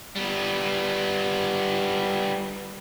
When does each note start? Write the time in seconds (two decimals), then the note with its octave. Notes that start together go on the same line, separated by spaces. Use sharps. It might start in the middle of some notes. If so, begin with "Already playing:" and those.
0.15 G3 B3